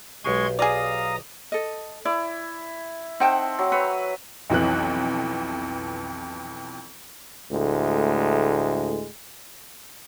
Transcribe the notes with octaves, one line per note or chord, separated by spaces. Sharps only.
B1 G#3 G4 G#5 C6 C#6 G#6
G#4 D5 F5 A#5 D#6
A4 D#5
E4 D5
C4 D#4 F#5 G5 A5
F#3
B4 C#5
B1 F2 E3 F#6
D2 A2 G#3